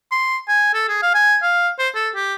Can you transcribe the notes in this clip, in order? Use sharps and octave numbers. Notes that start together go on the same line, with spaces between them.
C6
G#5
A4
G#4
F5
G#5
F5
C5
A4
G4